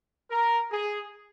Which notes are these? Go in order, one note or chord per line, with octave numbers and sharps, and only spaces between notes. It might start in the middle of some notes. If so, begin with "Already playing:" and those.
A#4
G#4